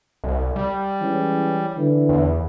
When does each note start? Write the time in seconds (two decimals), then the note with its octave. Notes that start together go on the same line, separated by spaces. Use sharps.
0.24 C2
0.56 G3
1.00 E3 G#3 C#4
1.76 D3 E3
2.09 E2